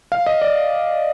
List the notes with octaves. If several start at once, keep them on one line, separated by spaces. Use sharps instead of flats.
F5
D#5
D5